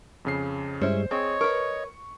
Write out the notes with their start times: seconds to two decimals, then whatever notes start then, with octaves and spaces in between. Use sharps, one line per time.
0.25 F2 C#3 C7
0.82 G2 G3 G#3 C#4 E4 C5
1.11 C4 G#4 C#5 D#5
1.41 A#4 B4 C#6